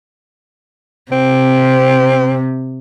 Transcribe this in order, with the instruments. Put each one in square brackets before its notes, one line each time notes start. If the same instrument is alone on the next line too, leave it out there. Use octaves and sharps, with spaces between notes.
[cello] C3 [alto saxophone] C4